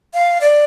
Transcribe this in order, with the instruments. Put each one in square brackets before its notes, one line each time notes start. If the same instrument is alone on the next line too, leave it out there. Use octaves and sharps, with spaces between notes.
[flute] F5
D5